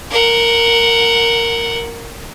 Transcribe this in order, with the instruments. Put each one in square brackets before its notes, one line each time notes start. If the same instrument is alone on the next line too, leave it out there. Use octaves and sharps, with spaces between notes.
[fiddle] A#4 F#5